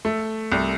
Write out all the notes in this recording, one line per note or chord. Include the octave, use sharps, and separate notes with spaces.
A3
C2